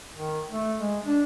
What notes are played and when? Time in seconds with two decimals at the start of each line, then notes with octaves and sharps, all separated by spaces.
0.15 D#3
0.51 A3
0.80 G#3
1.05 D4